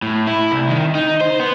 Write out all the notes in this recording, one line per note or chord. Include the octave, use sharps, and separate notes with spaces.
A2
E4
C2
D#3
D#4
C5
B3